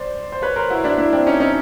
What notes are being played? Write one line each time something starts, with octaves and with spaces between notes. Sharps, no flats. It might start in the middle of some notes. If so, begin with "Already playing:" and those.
Already playing: C5 D5
C5
B4 C#5
A#4 C5
E4 F#4
D4 E4
D4 E4
C4 D4
C#4 D#4
C#4 D#4